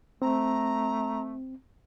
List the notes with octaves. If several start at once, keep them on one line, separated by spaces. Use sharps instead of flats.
A3 C4 A#5